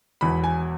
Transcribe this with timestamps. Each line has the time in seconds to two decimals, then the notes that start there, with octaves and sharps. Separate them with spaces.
0.21 E1 E2 E3 B5
0.44 G#5